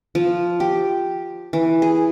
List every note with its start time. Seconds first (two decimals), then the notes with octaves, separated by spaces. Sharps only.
0.15 F3
0.60 G4
1.53 E3
1.82 G#4